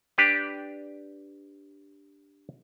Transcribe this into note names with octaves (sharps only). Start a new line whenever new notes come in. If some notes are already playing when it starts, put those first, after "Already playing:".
D4 G4 B4